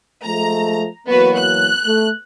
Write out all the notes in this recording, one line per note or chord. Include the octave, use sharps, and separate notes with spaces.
F3 G#3 A3 A#5
E3 F#3 A#3 B3 F#4 B4
F#6
A3